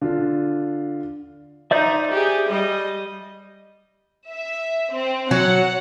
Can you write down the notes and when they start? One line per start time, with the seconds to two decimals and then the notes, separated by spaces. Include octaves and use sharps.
0.01 D3 D4 F4
1.71 D#4 C5 D5 E5
2.11 G4 G#4
2.49 G3 D#5
4.29 E5
4.92 C4
5.31 F#3 F#5